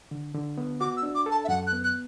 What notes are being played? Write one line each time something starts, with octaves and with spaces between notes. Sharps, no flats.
D3
D3
B3
F#4 D6
E6
D4
D6
A4
A5
E5
F#2 F#5
F#6
B3
F#6